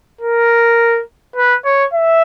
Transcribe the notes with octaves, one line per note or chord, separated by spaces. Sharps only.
A#4
B4
C#5
E5